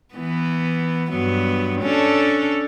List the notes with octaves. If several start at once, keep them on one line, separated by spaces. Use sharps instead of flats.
E3 B3
G2 F#3 B3
C#4 D4 A4